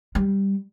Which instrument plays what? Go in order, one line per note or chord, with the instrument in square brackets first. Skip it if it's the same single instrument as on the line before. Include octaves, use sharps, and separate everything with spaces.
[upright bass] G3